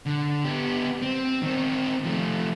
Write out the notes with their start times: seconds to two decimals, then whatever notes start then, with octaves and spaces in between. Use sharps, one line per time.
0.06 D3
0.44 B3 G4
1.02 C4
1.42 D#3 C4
2.04 F3 A3